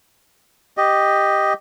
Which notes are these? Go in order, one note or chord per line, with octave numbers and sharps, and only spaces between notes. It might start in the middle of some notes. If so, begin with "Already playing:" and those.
G4 D#5